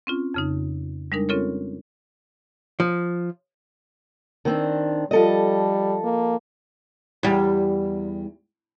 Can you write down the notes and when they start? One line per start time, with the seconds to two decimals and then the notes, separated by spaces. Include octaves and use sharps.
0.07 C4 C#4 F4
0.34 F2 C#3 D#4
1.12 G3 G#3 D4 D#4 A#4
1.29 C4 C#4 F4 A4 A#4 C#5
2.80 F3
4.45 D#3 C4 D4
5.11 F3 G3 A4 D#5
6.04 A#3
7.23 E2 G3